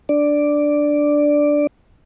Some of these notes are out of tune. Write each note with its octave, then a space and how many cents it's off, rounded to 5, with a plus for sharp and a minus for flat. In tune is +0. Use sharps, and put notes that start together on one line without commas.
D4 +0 D5 +0